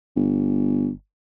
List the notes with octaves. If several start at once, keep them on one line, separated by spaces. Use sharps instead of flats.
G1